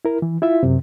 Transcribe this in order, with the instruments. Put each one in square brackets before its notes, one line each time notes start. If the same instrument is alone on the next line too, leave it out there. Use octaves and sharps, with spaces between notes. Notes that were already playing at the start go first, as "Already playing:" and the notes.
[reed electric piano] E4 A#4
E3
E4 F4 E5
F#2 C3